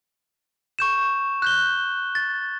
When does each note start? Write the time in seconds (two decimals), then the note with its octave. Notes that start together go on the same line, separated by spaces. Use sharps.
0.79 C#6 G6 E7
1.42 F#6 G6 G7
2.15 A6